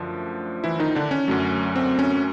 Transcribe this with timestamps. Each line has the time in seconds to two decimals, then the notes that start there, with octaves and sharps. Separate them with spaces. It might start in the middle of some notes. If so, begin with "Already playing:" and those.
Already playing: F#2 D3 F3 A3
0.64 E3 E4
0.79 D#3 D#4
0.95 D3 D4
1.11 C#4
1.28 F#2 D3 F#3 A3
1.76 C4
1.99 C#4